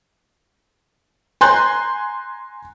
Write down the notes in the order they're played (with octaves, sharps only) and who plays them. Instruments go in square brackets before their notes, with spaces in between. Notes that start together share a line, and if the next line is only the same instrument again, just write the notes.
[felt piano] G#5 A#5 C6 F#6 G6